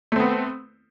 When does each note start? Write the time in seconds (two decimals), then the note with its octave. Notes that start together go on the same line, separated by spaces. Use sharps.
0.12 A3
0.16 C4
0.20 B3